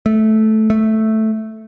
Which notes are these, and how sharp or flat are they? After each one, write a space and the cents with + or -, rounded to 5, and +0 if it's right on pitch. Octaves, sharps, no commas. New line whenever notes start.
A3 -10
A3 -5